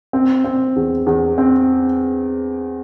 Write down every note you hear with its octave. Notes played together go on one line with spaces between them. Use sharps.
C4
C4
E2
E2
C4